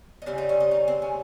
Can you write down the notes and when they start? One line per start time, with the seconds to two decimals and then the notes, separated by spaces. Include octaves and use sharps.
0.22 D#4
0.26 C#3 G3 C4 C#4
0.38 D#4
0.49 C#4
0.60 D#4
0.71 D#4
0.88 C4
1.02 C#4